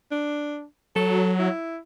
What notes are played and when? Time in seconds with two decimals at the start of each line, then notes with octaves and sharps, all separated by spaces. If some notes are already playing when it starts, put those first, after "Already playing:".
0.11 D4
0.96 F#3 A4
1.39 E4